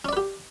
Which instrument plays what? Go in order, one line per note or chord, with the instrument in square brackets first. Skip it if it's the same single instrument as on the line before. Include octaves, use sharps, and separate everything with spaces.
[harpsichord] C#4
D5
B4
G4